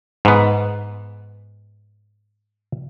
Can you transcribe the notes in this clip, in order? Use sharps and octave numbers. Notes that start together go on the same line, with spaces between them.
G#2 B3